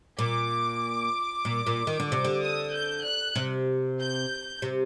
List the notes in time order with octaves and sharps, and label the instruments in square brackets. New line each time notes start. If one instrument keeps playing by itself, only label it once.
[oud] A#2 [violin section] D6
[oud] A#2
A#2
D#3
D3
[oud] C3 [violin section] D6
[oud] D3
[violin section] D#6
G6
F#6
[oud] C3
[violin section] G6
[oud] C3